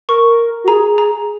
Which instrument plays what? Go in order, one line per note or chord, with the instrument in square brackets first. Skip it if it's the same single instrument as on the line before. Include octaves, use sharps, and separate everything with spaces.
[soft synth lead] A#4 [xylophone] C#6
[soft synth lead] F#4
[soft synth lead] G#4 [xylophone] A#5
[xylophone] A#5